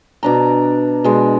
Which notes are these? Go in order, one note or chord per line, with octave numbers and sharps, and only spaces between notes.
B2 D4 A#5
B2 G#3 D4